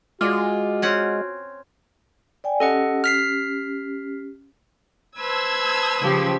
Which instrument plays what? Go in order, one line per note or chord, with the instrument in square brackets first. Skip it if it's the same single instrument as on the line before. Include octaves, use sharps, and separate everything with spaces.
[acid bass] G#3 [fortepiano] F4 D5 [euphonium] F#4
[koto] C4 C#4 F#5
[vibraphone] D5 G5 G#5
[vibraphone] C#4 G4 [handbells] A4 D#5 F#5
[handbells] F6 B6 C7
[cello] B4 C5 [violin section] A5 E6 G#6
[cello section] C#3 F3 G4